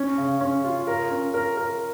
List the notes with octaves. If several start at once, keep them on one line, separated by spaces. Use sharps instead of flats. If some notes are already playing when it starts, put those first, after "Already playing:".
Already playing: C#4
C#3
C#4
F4
A#4
C#4
A#4
A#4